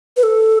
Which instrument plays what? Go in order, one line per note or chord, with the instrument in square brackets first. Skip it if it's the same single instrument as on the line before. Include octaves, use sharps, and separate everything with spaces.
[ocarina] B4
A4